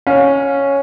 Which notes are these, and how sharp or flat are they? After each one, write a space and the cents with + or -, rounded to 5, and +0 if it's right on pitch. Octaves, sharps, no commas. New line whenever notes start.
C#4 +0 F5 +40